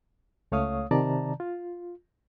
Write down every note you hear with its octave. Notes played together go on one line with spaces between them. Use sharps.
C#2 A3 C#5 F5 D#6
C3 D#3 D5 A5 A#5
F4